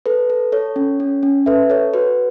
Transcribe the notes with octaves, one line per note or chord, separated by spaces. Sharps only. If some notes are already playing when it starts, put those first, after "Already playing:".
A4 B4
A4
A4 C#5
C#4
C#4
C#4
A4 B4 E5
A4 C#5
F#4 B4